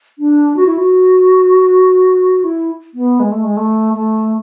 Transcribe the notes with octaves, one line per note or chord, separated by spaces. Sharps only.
D4
F#4
E4
F#4
E4
B3
G#3
A3
G#3
A3
A3